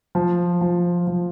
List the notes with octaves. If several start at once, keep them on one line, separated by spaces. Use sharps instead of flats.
F3
F3
F3